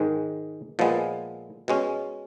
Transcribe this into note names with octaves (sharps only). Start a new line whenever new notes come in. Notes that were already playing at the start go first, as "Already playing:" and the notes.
Already playing: G#2 D#3 G#3
A#2 F3 G#3 B3
B2 G#3 C#4